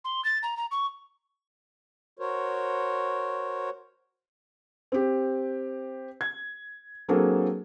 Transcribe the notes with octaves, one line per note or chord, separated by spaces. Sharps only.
C6
A6
A#5
A#5
C#6
F#4 A#4 C5 C#5
C4 G4
G#6
F#3 A#3 C4 D4 G#4 A4